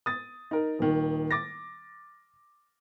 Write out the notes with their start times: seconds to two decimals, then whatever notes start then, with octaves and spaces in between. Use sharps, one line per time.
0.06 D#6 A6
0.51 D#4 A#4
0.79 D#1 D#3
1.31 D6 A6 A#6